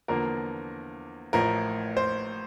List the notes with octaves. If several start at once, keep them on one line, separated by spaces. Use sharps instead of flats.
E2 D3 F3 A#3 A#4
A1 A2 F3 A#4
C5